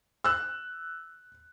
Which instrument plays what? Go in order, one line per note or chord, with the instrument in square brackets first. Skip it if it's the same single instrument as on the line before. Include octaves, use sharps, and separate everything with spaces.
[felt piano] E6 F#6